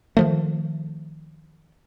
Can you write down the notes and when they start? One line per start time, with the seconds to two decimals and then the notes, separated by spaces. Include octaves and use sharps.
0.17 D#3 F3 A3